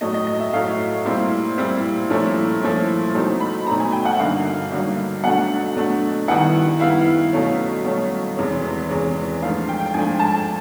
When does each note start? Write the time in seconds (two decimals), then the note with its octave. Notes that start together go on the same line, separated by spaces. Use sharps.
0.01 A2 F#3 A3 D#5
0.14 D#5
0.27 D#5
0.40 E5
0.53 A2 F#3 A3 F5
1.05 A#2 G3 C4 E4
1.58 A#2 G3 C4 E4
2.10 A#2 F3 A3 C#4 E4
2.62 A#2 F3 A3 C#4 E4
3.14 B2 F#3 A3 C4 D#4
3.40 B5
3.67 B2 F#3 A3 C4 D#4 A#5
3.80 G#5
3.92 G5
4.05 F#5
4.15 E5
4.19 G2 D3 F#3 A#3 D#4 F5
4.71 G2 D3 F#3 A#3 D#4
5.23 B2 F#3 A3 D4 F#5
5.76 B2 F#3 A3 D4
6.28 D#3 G3 B3 E4 F#5
6.80 D#3 G3 B3 E4 F5
7.33 B2 F#3 A3 C#4
7.84 B2 F#3 A3 C#4
8.37 E2 C3 E3 G#3 C#4
8.90 E2 C3 E3 G#3 C#4
9.42 G#2 F3 A3 D4 F5
9.68 G5
9.80 G5
9.94 G#2 F3 A3 D4 G#5
10.20 A5